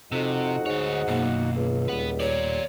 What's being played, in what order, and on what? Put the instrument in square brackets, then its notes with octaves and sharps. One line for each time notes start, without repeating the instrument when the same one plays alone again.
[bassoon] F2 [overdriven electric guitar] C3 [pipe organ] D#4 F#4 F#5
[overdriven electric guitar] D2 C#5 [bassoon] G#2
[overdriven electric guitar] B1 F#2 [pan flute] A#3
[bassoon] C#2
[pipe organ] D#2 A#2 G3 [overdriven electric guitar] B4 F#5
[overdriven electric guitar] A#4 D5 [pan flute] C#5